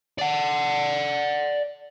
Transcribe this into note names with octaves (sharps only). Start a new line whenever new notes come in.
D5 F#5